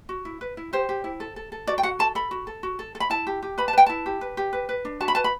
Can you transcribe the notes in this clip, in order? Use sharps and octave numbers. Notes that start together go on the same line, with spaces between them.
F#4
E4
B4
E4
G4 C5
G4
E4
A4
A4
A4
F#4 D5
G5
F#4 F#5
A4 A5
A4 B5
F#4
A4
F#4
A4
A4
B5
E4 A5
G4
G4
B4 B5
A5
B4 G5
E4 A5
G4
B4
G4
B4
B4
D4
F#4 A5
B5
B4 A5
B5